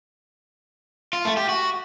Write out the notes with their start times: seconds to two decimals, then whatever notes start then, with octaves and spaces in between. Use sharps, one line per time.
1.13 F4
1.25 A3
1.37 G4
1.49 F#4